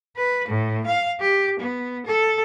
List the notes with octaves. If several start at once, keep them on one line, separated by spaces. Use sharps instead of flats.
B4
A2
F5
G4
B3
A4